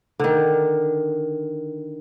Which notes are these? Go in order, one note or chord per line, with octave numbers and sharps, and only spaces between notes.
D3 D#3